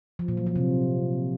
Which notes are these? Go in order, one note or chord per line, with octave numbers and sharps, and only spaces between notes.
F3
A#2
F#3
F3
C3